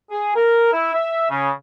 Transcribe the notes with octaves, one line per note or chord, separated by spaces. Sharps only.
G#4
A#4
E4
E5
C#3